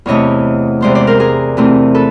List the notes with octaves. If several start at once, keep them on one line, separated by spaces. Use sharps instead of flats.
E2 C3 E3 A3 C#5 D#5
C3 E3 G#3 B3 C5 D5
C5 D5
A#4 C5
G#4 A#4
C3 E3 A3 C4
A4 B4